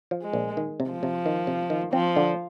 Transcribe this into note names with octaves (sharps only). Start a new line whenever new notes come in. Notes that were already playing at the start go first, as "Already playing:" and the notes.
F3
G#3
A#1
D#3
C3
F3
C3
D#3
C3
D#3
F3 C4
D3